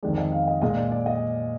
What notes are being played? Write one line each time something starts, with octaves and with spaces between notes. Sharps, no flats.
F2 D#3 G#3 D5
D5
D#5
F5
D#5
A#2 G#3 D#5
D5
D5
D#5